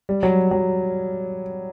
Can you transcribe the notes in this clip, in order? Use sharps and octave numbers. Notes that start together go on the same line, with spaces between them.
G3
F#3
F#3